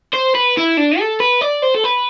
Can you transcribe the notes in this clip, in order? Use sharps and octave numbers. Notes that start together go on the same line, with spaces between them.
C5
B4
E4
D4
A4
B4
D5
C5
A4
B4